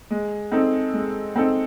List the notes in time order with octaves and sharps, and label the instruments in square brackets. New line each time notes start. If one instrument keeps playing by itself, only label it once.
[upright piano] G#3
C4 D#4 A4
G#3
C4 D#4 A4